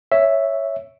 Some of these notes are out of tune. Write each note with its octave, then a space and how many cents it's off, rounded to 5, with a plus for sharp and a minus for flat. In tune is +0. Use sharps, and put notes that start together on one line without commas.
C#5 +0 E5 +0